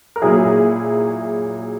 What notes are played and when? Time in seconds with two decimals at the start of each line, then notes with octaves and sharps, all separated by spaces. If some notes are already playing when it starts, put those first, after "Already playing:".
0.16 A#4
0.22 A#2 F#3 E4 G#4